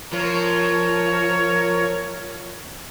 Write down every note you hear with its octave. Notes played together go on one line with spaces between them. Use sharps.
F3 A#4 C#5